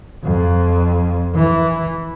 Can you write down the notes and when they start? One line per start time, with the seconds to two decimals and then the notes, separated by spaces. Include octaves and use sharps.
0.24 F2
1.35 E3